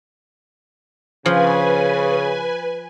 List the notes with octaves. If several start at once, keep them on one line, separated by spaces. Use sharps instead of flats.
C#3 F3 B4 G#5